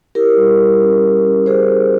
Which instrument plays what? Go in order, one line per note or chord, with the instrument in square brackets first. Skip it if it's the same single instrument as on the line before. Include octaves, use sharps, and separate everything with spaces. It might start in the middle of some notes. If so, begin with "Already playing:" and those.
[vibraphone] E4 G4 A#4
G3
G3
C#4
E4
C#4
C#4 G#4 C5
G3